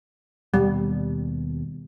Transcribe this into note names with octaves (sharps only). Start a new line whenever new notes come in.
D#2 B2 G3